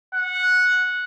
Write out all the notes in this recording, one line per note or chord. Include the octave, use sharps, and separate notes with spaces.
F#5